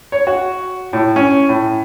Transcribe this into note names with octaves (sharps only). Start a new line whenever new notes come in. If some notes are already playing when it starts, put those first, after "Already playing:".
C#5
F#4
A2
C#4
A2